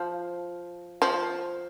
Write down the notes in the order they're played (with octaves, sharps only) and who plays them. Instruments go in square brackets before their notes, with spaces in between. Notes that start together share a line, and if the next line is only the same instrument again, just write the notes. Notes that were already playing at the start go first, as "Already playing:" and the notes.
Already playing: [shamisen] F3
F3